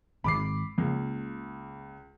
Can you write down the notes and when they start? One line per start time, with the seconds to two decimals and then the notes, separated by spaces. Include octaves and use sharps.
0.24 G#1 G#2 D#3 B5 D6 C7
0.78 C#2 C#3 A#3